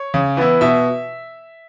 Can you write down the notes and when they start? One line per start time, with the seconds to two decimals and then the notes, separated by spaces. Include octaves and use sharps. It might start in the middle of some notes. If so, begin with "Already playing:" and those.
Already playing: C#5
0.14 C#3
0.37 E3 B3 E4
0.61 B2 E5